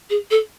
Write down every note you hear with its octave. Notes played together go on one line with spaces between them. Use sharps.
G#4
A4